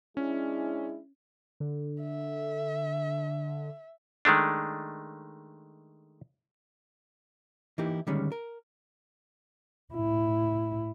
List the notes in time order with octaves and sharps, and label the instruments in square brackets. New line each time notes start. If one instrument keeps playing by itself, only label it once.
[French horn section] G#3 D4 E4 [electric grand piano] C#4
[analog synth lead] D3
[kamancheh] E5
[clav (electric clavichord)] D#3 G#3 A3 D4
[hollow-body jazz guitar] E3 A#3 D#4 E4 G4
D3 D#3 G3 G#3 C#4
A#4
[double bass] A2 E4